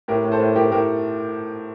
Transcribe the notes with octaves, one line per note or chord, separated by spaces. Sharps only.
A2 G4 A#4
A2
A4 C5
A2
A2 G4 A#4
A2 G4 A#4